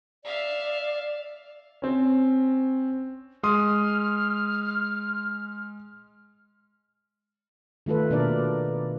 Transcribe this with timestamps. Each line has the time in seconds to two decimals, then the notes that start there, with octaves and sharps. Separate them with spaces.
0.25 D5 E5 F5
1.82 C4 C#4
3.43 G#3 C6 D#6 F6
7.86 D#3 A3 F4 A4 B4
8.10 B2 A#3 D4 A#4 D5